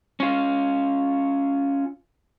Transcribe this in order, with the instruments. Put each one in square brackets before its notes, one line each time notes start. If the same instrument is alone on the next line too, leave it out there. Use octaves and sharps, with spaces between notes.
[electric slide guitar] C#4 F4